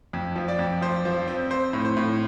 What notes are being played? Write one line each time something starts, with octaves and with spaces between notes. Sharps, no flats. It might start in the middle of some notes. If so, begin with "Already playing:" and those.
F2
F3
D5
F2
F3 C5
F3
C4
C4 C5
A2
C5
A2